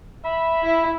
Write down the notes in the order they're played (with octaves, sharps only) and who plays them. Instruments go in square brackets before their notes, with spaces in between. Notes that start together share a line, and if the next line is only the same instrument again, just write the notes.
[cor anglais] E5 [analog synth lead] B5
[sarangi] E4